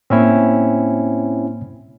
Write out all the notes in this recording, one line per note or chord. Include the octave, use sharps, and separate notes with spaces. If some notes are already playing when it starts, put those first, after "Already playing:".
A2 A#3 C4 C#4 E4